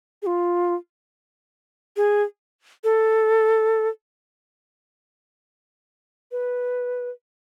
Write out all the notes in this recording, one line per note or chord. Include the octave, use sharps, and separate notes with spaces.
G#4
F4
G#4
A4
B4